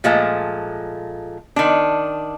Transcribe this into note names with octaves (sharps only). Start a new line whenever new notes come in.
A#2 F3 G#3 A3
D#3 D4